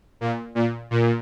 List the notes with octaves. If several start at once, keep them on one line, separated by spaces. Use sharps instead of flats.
A#2
A#2
A#2